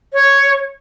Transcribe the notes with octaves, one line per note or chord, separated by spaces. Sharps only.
C#5